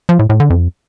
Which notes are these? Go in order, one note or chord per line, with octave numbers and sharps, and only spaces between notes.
F3
A2
A2
D3
F2